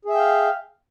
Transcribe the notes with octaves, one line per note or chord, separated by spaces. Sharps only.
G#4 E5 F5 G5